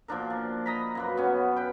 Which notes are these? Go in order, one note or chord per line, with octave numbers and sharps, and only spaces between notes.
A#2 F3 D4 A#4
F3
D#5 A#5 B5
F#2 A#3 B4
B3 C#4
B4 G5